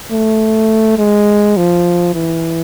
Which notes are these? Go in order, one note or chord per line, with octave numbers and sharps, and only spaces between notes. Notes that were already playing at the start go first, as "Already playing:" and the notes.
A3
G#3
F3
E3